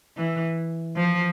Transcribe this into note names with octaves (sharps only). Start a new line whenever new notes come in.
E3
F3